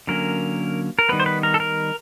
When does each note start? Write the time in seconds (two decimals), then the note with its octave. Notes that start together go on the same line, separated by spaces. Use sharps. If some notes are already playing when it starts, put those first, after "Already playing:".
0.07 D3 F#3 A#3 C#4 A#4
0.99 A#4
1.09 D#3 G3 B3 B4
1.20 C5
1.26 B4
1.43 A#4
1.54 A4
1.60 A#4